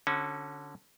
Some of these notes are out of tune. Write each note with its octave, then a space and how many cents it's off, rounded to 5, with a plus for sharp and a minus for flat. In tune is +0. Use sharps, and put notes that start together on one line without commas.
D3 -5 C#4 -20 F#4 +5